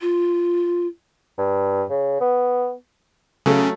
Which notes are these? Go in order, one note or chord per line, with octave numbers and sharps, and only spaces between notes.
F4
G2
C#3
B3
C#3 F#3 A3 A4